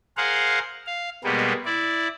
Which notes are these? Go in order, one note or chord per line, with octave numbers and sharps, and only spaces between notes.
G#4 A#4 C5 F5 F#5
F5
B2 G3 G#3 A#3 B3
E4 D5